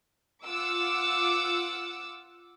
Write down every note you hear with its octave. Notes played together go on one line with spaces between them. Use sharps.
F4 F#5 D6 E6